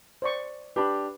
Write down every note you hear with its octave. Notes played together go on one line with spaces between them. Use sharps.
C5 D5 C#6
D4 G4 B4 B5